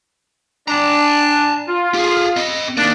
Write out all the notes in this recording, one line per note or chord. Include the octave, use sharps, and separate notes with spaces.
D4 A5 A#5
F4
G4 G#4
C4 D#5
D#3 A#3 D4